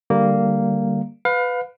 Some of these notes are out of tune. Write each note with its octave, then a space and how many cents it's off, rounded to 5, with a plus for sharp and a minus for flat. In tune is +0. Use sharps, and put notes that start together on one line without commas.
D3 +10 G3 +0 A#3 -10
B4 +15 F5 +30